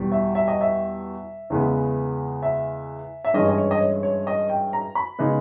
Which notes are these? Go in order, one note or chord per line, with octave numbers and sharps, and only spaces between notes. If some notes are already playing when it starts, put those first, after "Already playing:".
Already playing: E2 B2 G3
E5
E5
D#5
E5
E2 C#3 G#3 B3
E5
E5
G2 E3 G#3 C#4 D#5
D#5
C#5
D#5
C#5
C#5
D#5
G5
A#5
B5
C#3 G#3 B3 D#4